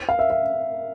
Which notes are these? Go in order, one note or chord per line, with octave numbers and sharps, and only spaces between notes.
F5
E5
E5